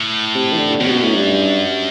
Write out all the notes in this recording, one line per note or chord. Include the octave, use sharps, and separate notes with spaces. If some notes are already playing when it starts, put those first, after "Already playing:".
Already playing: A2
C3
E3
D3
F#2 B2
C3
B2
A2
G2